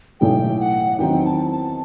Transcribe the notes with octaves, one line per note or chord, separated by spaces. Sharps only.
B1 A2 E3 A3 G5
F#5
E2 D#3 F#3 C4 D#4 G5
A5
A5